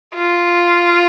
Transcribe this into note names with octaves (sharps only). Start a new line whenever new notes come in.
F4